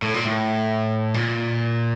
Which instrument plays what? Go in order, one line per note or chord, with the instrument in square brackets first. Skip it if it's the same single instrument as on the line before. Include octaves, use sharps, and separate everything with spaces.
[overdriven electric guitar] A2
A#2
A2
A#2